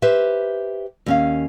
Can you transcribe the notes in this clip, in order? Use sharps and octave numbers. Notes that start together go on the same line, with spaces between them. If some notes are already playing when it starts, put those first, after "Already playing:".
G4 B4 C5 E5
D#2 C#4 F5